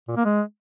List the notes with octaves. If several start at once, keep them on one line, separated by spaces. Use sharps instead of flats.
A#2
A#3
G#3